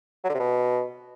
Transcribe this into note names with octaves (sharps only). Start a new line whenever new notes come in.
F#3
D3
C3
B2